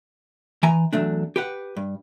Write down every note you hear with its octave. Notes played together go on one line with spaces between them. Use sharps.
E3 G#5 A#5
E2 F#3 A3 D4
G4 B4 F#5
G2